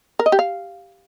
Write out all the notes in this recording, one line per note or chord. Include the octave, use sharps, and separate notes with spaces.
A#4
D#5
G4
F5